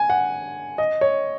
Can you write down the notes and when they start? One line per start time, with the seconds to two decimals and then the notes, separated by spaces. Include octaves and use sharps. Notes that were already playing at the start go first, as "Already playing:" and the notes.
Already playing: G#5
0.10 F#5
0.78 D#5
1.01 C#5